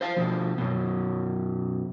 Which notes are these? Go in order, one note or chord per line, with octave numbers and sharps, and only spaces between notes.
C5 F5 G5 A5
B2 F3
F#2 B2